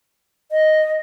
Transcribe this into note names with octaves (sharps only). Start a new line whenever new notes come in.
D#5